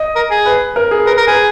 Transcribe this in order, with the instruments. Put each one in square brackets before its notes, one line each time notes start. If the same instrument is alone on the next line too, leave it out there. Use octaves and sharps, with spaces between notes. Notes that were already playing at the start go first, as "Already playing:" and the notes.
Already playing: [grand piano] D#5
[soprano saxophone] A#4
G#4
[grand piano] B4
A#4
G#4
[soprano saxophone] A#4 [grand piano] B4
[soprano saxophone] A#4
[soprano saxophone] G#4 [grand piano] B4